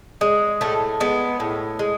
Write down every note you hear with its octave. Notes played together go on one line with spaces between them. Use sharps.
G#3
A2 A3
G#3 B3
A2
G#3